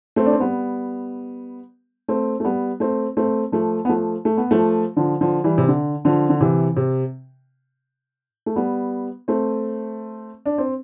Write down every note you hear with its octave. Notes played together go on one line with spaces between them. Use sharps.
A3 C4
D4
C4
G3 B3
A3 C4
A3
G3 B3
A3 C4
A3 C4
F3 A3
B3
F3 A3
A3
B3
F3 A3
D3 F3
D3 F3
E3 G3
C3
D3
D3 F3
D3
C3 E3
C3
A3
G3 B3
A3 C4
D4
C4